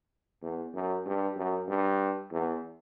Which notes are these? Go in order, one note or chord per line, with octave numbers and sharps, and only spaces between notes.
E2
F#2
G2
F#2
G2
E2